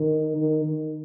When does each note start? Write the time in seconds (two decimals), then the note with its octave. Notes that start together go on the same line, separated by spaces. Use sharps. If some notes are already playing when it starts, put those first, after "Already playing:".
Already playing: D#3
0.36 D#3
0.65 D#3